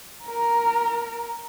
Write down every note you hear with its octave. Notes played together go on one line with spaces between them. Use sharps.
A#4 A#5